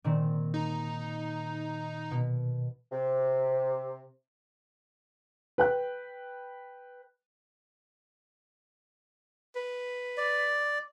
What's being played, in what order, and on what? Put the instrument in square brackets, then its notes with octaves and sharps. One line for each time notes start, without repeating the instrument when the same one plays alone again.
[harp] A#2 D#3 C4
[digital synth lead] D#4
[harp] B2
[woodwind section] C3
[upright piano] B4 G5 F#6
[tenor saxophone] B4
[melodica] D5